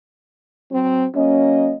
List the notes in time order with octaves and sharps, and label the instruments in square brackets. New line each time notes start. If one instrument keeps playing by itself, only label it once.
[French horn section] F#3 C4
[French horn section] F#3 A#3 D#5 [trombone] C#4